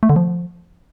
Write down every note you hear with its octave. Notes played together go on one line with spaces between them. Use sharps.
A3
D3
F3